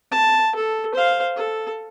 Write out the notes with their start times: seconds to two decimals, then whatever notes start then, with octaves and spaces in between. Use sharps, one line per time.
0.12 A5
0.56 A4
0.94 C5 F5
1.36 A4